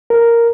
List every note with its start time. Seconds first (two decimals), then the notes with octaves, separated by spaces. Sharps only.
0.10 A#4